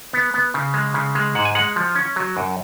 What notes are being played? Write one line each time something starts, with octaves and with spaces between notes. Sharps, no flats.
B3
B3
C#3
G#3
C#3
G#3
G#2 F#5
G#5
G#3 F#5
F3
C#4
F#3
F#2